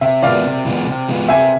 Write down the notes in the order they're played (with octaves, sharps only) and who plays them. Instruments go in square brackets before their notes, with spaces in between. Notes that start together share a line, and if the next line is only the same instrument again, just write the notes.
[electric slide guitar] C3 [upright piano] E5
[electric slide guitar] E3 G#3 B3 F4 [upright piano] D5 F5
[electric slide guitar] C3
E3 G#3 B3 F4
C3
E3 G#3 B3 F4
[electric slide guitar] C3 [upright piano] E5 G#5